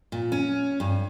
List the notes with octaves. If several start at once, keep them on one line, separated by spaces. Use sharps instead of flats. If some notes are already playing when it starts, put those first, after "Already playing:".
A#2
C#4
G2